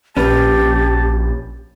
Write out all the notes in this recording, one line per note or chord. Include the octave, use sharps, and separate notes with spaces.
A#1 C#4 G4 B4 A5